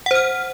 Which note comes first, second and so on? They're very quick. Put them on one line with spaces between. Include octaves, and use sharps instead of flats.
F#5 C5 F6